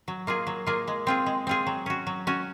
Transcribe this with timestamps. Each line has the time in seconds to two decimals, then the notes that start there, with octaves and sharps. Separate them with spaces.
0.08 F#3
0.27 A#3 F4 G#4
0.47 F#3
0.67 A#3 F4 G#4
0.87 G#3
1.07 C4 F4 G#4
1.26 G#3
1.47 C4 F4 G#4
1.66 F#3
1.86 C#4 F#4
2.07 F#3
2.27 C#4 F#4